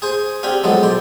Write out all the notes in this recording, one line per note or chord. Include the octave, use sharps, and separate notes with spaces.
G#4 C5 G#5
C4 D4 G4 F5 G#5
F3 F#3 G#3 B3 A4
B1 C5 D5